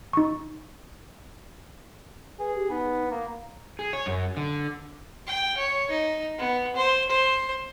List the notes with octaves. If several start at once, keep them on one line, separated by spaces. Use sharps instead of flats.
D#4 C#6
G#4 B4
G4
B3 D#4
A#3 F5
G#4
C#5
F#2
D3
G5
C#5
D#4
B3
C5
C5